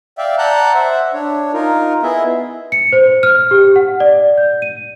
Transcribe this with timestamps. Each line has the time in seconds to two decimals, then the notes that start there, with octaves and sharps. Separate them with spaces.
0.18 D5 E5 F5 G5
0.38 D5 F#5 A5 A#5 F#6 G6
0.74 C5 E5 F#5
1.14 D4 C#5
1.53 D#4 F4 A#4
2.03 B3 E4 G#4 D#5 E5
2.72 C#7
2.92 C5
3.23 F6
3.51 G4
3.76 F#5
4.00 D5
4.38 G6
4.62 D#7